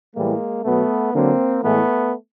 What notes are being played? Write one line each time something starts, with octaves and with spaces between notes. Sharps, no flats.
A2 E3 G3 G#3 A#3
B2 F#3 A3 B3
D3 F#3 A#3 C4
A2 E3 G#3 A3 B3